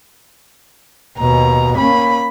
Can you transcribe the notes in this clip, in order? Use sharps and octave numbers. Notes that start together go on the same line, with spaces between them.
D#2 B2 A#5
A#3 C#4 B5